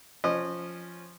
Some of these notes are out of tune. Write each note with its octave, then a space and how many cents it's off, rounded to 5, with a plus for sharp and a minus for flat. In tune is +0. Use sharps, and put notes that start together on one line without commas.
F3 +0 C#4 +0 D#5 -30